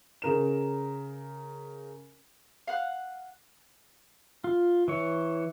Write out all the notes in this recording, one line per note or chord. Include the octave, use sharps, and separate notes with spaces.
C#3 A#4 E7
F5 F#5 F#6
F4
E3 C#5